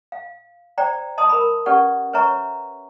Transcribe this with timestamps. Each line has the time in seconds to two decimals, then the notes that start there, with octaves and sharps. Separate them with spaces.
0.12 F5
0.78 C5 D5 G5 A#5
1.18 D#5 A5 C6 D#6
1.29 A#4 B5
1.66 C#4 G4 B4 D5 F#5 C#6
2.13 B4 C#5 E5 A#5 C#6